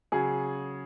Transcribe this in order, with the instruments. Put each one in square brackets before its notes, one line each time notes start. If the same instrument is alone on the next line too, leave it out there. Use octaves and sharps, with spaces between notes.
[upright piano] C#3 F#3 G#4